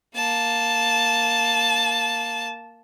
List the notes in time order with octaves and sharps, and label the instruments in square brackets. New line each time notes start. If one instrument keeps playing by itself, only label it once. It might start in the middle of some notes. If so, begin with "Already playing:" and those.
[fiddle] A#3 A5